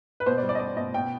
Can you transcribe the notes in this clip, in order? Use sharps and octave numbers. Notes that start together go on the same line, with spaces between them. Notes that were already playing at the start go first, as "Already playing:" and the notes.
B4
B2 C5
D5
G3
D5
D#5
G3 D5
B2 D#5
B2 G5